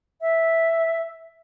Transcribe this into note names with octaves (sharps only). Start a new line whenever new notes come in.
E5